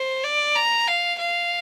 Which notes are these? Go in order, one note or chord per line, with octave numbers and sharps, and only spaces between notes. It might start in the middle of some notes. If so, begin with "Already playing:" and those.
Already playing: C5
D5
A#5
F5
F5